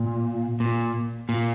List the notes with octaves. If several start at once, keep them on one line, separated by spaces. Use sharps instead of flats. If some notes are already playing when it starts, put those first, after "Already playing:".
Already playing: A#2
A#2
A#2